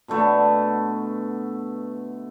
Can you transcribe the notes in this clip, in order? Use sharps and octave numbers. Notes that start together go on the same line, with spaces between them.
B2 D3 A3 B3